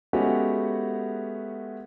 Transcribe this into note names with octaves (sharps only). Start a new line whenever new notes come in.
G#3 A3 B3 C#4 F#4 G4